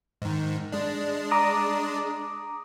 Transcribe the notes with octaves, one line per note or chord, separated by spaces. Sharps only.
G#2 D#3
G#3 D4
A#5 D6 D#6